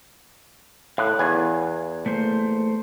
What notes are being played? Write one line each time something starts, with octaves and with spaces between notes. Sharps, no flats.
A2 F5 F#6
E2 G#5
A3 A#3 C5